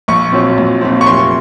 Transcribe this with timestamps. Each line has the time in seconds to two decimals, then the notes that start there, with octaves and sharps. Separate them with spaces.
0.08 A#1 C#6
0.32 A#2 F#3 C4
0.58 A#1
0.81 A#2 F#3 C4
1.01 C#6
1.06 F1 C6